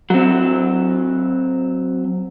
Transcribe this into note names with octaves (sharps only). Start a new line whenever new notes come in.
F#3 C4